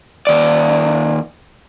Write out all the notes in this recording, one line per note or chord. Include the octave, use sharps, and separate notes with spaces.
D#2 D5